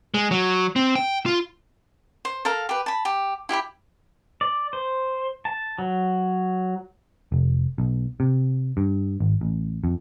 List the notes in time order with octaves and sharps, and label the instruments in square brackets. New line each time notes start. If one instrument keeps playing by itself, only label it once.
[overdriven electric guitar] G#3
F#3
C4
G5
F4
[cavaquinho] C5
A4 A#4 F5 A#5
G4 B4
A5 B5
G4
E4 G4 F5 B5
[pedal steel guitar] D5
C5
A5
F#3
[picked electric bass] F1
B1
C3
G2
G#1
A1
F2